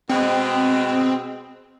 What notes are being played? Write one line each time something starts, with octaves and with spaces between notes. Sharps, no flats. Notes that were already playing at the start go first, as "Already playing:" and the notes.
B2 G#3 C4